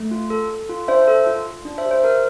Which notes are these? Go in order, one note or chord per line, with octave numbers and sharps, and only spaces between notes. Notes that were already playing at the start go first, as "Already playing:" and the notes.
Already playing: A3
F4
A4
A4
F4
D4 C5 E5
A4
F4
F4
D4
C5 E5
G4
C5
G4 A#4